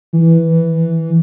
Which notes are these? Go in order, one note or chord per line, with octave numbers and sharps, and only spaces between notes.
E3